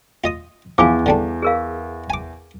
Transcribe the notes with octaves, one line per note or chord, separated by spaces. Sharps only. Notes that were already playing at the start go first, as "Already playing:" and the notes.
F4 D#5 D#6
E2 F3 F4 F5 G#5 D6
D3 G3 D4
G#4 A#4 F5
G#5 D6